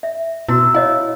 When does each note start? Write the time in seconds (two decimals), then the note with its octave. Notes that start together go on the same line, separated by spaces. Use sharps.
0.03 E5
0.49 B2 E4 F#4 E6
0.74 E4 C#5 D#5 F5